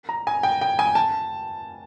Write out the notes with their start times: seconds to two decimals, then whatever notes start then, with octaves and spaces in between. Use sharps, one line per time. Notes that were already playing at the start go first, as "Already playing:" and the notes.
0.09 A#5
0.27 G#5
0.43 G5
0.61 G5
0.79 G#5
0.95 A5